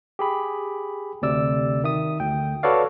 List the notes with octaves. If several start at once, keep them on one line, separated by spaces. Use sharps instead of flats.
G4 G#4 B5
D2 C3 D5 E6
D#3 E5 D#6
D2 G5
F#4 A4 B4 C#5 D5 F5